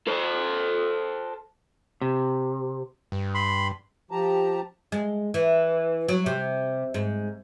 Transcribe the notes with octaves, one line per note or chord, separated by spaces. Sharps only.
A4 C5
C3
G2
B5 C6
F3 G4 A5 A#5
G#3
E3
F#3
C3
G#2